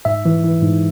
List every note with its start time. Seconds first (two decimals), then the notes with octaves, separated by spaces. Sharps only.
0.05 G#2 E5
0.25 E3
0.44 E3
0.63 G#2